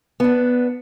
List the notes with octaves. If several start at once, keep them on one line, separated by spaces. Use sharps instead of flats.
B3 D4